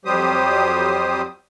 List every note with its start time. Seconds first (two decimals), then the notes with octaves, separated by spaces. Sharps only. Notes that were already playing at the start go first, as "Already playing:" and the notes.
0.05 F2 F#3 G3 G4 C5 D#6